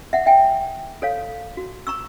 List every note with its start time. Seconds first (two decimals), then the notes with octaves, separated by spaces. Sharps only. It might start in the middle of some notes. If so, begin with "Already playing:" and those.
0.13 E5 F#5
0.26 E5 G5 G#5
1.02 A4 C#5 F5
1.57 F#4
1.87 A#5 C#6 E6